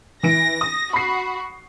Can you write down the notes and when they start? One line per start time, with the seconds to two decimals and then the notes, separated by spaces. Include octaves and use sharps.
0.23 E3 A#6 D7
0.61 D#6
0.93 F#4 B5 C7